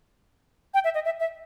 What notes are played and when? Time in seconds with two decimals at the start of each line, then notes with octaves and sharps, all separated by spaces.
0.74 G5
0.84 E5
0.94 D#5
1.05 E5
1.20 E5